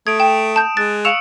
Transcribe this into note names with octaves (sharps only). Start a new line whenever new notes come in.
A3 D#6 G#6 D7
G5 E7
A5 G6
G#3 F#6 A6
F5 C#6 E6 C#7 E7 F7